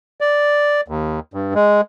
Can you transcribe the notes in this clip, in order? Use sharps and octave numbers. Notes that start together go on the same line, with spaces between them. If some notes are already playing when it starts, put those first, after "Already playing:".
D5
D#2
G2
G#3